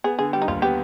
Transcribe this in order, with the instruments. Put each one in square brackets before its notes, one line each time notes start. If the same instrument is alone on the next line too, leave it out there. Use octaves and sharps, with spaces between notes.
[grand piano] B3 [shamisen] G#4
[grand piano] D3 [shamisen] G#4
[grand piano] G3 [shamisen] G4
[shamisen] D#4
[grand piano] D#2 [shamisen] F4
[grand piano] B3 [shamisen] G4